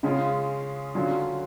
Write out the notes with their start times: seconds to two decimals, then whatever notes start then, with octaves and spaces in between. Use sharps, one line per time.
0.03 C#3 G#3 C#4 F4
0.95 D3 F#3 C#4 F4